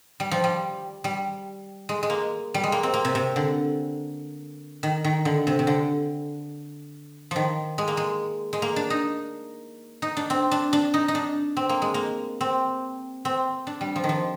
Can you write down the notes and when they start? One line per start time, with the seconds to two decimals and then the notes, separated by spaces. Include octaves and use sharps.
0.20 G3
0.31 F3
0.44 G3
1.04 G3
1.89 G#3
2.03 G#3
2.10 A#3
2.54 G3
2.63 G#3
2.72 A#3
2.83 C4
2.94 A#3
3.05 C3
3.15 C3
3.36 D3
4.83 D#3
5.04 D#3
5.25 D3
5.47 C3
5.59 C3
5.67 D3
7.31 D#3 F3
7.78 G#3
7.88 A#3
7.97 G#3
8.53 G#3
8.62 A#3
8.76 D4
8.90 D#4
10.02 D#4
10.17 D4
10.30 C4
10.51 D4
10.73 D4
10.94 D#4
11.08 D#4
11.15 D4
11.57 C4
11.69 A#3
11.82 G#3
11.94 A#3
12.41 C4
13.25 C4
13.67 D4
13.81 G3
13.96 F3
14.04 D#3
14.09 F3